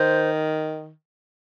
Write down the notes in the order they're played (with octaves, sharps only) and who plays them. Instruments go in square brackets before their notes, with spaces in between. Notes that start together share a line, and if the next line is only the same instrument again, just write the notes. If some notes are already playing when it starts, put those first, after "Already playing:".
Already playing: [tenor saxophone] D#3 [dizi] C5